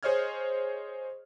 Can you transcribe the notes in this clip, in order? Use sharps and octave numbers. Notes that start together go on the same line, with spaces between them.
G#4 C5 C#5 D#5 F6 G#6